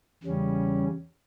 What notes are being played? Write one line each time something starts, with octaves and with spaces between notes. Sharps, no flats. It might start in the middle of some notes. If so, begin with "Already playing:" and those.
E2 C#3 G3 C#4